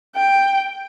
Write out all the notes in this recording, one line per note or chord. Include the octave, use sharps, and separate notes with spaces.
G5